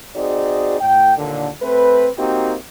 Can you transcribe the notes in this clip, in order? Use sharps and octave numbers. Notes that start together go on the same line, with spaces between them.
C4 D#4 F#4 G#4 D5
A2 G5
D#2 A#2 D3
A3 C4 B4
A#3 C4 D#4 F#4 G4